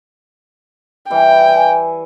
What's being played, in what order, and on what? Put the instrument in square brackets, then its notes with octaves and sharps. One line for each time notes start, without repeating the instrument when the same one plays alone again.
[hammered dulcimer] E3 G3 E4 [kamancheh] G5
[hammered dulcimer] G#5